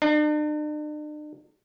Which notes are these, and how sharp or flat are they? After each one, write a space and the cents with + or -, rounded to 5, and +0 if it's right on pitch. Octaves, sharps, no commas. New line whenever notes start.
D4 +45